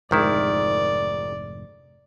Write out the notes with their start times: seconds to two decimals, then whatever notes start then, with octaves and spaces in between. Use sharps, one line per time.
0.11 F1 A#1 G#2 D3 D#3 E4 D5